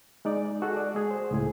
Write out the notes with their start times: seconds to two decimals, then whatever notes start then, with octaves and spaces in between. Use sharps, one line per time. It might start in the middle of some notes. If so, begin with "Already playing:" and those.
0.25 G#3 D#4 D5
0.62 F#4 G#4 A4
0.76 D5
0.95 G#3 G#4
1.11 C5
1.31 C#2 A2 G#4